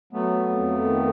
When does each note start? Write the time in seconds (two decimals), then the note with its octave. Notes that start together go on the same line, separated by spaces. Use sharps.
0.13 F#3 A3 B3
0.49 F2
0.84 D#3